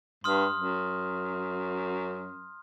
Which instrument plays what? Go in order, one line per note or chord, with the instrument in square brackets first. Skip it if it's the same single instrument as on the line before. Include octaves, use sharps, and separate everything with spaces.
[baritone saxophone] G2 [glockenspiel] C6 D#6 F6
[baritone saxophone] F#2